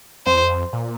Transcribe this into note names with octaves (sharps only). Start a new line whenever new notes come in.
F2 C5
E2
F2
A#2